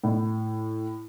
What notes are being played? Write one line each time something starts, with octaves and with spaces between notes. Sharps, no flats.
A2